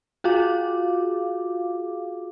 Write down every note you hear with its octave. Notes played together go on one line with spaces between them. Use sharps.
F4 F#4 G#4 F5 D6